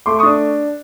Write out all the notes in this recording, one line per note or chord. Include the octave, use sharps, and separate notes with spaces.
A3 C6 D6
D4 C#6 D#6